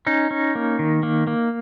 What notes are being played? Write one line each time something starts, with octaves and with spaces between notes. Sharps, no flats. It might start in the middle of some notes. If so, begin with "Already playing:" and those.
C#4 D#4
C#4
A#3
D#3
A#3
A#3